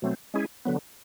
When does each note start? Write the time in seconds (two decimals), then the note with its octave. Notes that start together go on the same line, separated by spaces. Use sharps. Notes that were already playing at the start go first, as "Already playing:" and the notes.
0.02 B2 F#3 A3 C4
0.34 G#3 C#4 E4 G#4
0.65 D3 F#3 B3